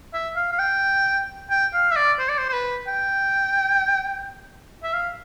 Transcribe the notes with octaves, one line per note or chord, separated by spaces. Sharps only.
E5
F5
F5
G5
G5
F5
E5
D5
C5
D5
C5
C5
B4
G5
E5
F5